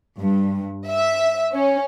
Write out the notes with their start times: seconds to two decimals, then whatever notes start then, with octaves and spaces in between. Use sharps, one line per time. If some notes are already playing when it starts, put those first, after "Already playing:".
0.19 G2
0.88 E5
1.53 C#4